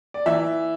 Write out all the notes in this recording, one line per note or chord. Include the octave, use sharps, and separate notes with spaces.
D5
E3 E5